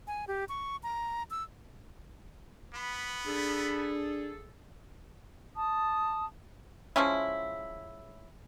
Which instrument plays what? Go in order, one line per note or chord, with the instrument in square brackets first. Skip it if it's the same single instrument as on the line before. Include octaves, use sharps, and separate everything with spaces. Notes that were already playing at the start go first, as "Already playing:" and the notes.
[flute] G#5
G4
C#6
A#5
E6
[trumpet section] B3 B5
[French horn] D4 [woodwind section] G#4 A4
[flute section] A5 D#6
[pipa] F3 G#3 C#4 E4